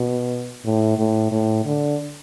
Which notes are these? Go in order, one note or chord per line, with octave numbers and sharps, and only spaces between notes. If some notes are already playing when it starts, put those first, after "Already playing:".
Already playing: B2
A2
A2
A2
D3